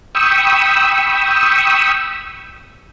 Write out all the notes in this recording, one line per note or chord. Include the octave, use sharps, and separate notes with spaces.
G5 B5 C#6 D#6 E6